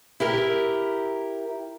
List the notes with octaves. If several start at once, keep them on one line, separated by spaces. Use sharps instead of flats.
E4 G4 A#4